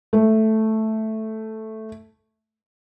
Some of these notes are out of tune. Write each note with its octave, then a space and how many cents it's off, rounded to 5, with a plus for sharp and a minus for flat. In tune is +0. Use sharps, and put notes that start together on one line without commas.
A3 -5